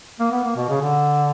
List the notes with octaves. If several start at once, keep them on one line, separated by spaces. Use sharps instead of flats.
A#3
B3
A#3
B2
C#3
D3